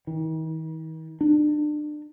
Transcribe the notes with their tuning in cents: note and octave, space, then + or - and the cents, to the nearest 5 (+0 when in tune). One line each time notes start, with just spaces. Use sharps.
D#3 +45
D4 +30